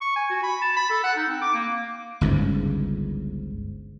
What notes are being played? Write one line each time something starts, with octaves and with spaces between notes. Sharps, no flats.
C#6
G#5
F#4
B5
A5
B5
A4
F#5
D#4
C4
D6
A#3
G1 C#2 G#2